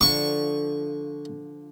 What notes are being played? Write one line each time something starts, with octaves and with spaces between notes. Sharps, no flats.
D3 F3 C#6